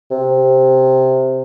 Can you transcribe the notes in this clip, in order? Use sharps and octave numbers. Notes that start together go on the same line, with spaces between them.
C3